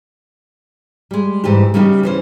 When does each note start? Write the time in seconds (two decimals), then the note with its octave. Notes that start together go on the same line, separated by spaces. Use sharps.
1.11 G3 G#3
1.44 G#2 E3 G3 G4
1.74 C#3 G3 A#3 D#4 F#4 G4
2.03 E3 C#4 C5